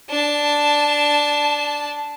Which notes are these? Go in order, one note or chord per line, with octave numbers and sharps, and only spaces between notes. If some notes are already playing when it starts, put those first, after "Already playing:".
D4 A5